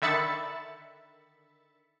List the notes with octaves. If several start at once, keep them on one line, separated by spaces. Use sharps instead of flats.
D3 D#3 E5 B5 A6 C#7